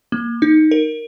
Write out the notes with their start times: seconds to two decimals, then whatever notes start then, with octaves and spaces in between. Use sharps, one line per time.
0.12 A#3
0.42 D#4
0.71 A#4